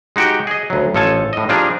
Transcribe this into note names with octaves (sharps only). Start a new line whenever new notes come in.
G#3 D#4 F#4 G4 G5
G#4 D#5
D2 F#3
A1 F3 A4 C#5 G#5 A5
A2 D#5
F3 G3 D4 G#4 A#4 D#5